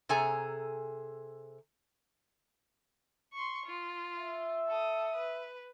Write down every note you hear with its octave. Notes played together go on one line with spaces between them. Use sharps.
C3 G#4 A4 G#5 A#5
C6 C#6
F4
E5
A4 D#6
B4